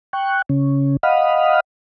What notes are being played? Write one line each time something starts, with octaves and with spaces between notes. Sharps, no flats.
G5 C#6 F#6
C#3 C#4
D#5 F5 F#5 B5 D#6 F6